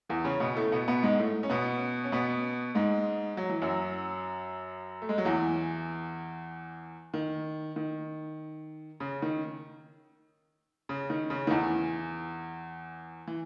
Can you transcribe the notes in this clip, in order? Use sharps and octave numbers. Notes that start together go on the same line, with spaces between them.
E2 E3
C#3 C#4
B2 B3
A2 A3
B2 B3
B2 B3
G#2 G#3
A2 A3
C#4
B2 B3
C#4
B2 B3
G#2 G#3
F#3
E3
F#2 F#3
A3
G#3
F#3
E2 E3
D#3
D#3
C#3
D#3
C#3
D#3
C#3
D#3
E2 E3
E3